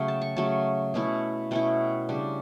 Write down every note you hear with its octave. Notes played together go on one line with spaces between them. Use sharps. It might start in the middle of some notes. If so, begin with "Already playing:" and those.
Already playing: C#3 F#3 A3 G5
A5
C#6
C#3 F#3 A3 A5
B2 A3 C#4 E4
B2 A3 C#4 E4 G5
C#3 G3 D4